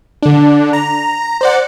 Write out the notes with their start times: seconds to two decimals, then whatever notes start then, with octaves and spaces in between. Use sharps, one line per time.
0.23 D3 D4
0.73 A#5
1.41 C5 D5 F#5